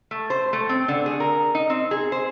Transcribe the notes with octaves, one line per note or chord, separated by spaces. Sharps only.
A3
C5
A3
C4
D3
G#4
A#4
D#4
C4
G#4
C5